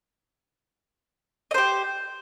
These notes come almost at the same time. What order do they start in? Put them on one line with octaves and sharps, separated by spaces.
D#5 C5 G4